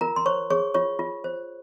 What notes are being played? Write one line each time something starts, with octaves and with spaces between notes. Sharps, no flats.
F4 A#4 A#5
C6
C5 C#5 C#6
G#4 C#5 C#6
F4 C#5 C#6
F4
C5